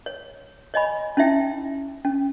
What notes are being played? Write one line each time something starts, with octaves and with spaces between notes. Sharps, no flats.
C#5
C#5 D#5 G#5 B5
C#4 D#4 E4 E5 G5
C#4